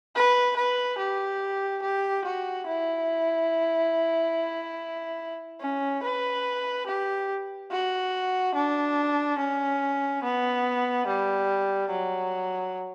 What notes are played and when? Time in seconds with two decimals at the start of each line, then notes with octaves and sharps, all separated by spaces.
0.16 B4
0.57 B4
0.98 G4
1.82 G4
2.25 F#4
2.67 E4
5.61 C#4
6.03 B4
6.87 G4
7.71 F#4
8.55 D4
9.38 C#4
10.24 B3
11.07 G3
11.90 F#3